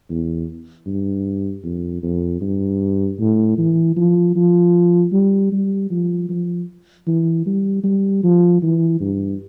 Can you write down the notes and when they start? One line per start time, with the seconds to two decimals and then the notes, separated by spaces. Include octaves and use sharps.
0.10 E2
0.86 G2
1.64 F2
2.03 F2
2.41 G2
3.20 A2
3.58 E3
3.96 F3
4.36 F3
5.13 G3
5.52 G3
5.90 F3
6.29 F3
7.07 E3
7.46 G3
7.84 G3
8.23 F3
8.62 E3
9.00 G2